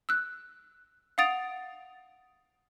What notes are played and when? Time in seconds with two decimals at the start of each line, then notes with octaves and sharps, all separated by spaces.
0.09 E6 F#6
1.18 F5 F#5 D#6 A6 D7 F7